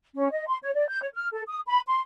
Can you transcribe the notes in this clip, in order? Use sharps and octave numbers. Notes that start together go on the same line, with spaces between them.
C#4
D#5
C6
C#5
D5
G6
C#5
F6
A4
D#6
B5
C6